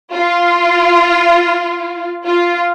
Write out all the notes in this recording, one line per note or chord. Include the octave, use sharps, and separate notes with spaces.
F4
F4